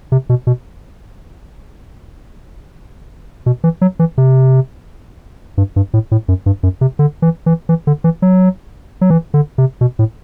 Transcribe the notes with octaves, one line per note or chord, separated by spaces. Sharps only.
C3
B2
B2
B2
E3
F#3
E3
C3
G2
G2
A2
A2
F#2
G2
F#2
C3
D3
E3
E3
E3
D3
E3
F#3
F#3
E3
D3
C3
B2
A2